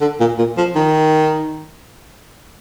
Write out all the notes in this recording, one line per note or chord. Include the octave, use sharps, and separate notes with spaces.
D3
A#2
A#2
F3
D#3